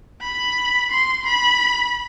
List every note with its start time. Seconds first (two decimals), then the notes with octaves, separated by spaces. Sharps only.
0.21 B5
0.91 C6
1.26 B5